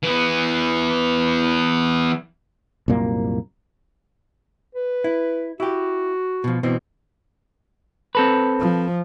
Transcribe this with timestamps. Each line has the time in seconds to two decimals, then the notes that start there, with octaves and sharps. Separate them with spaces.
0.03 E3 B3
2.88 C2 F#2 A#2 A#3
4.75 B4
5.04 E4
5.60 E4 F#4 G4
6.44 B2 F3
6.63 B2 E3 C4
8.15 C4 A4 B4
8.60 F3